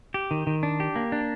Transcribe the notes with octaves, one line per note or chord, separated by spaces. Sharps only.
G4
D#3
D#3
D4
G4
A#3
D4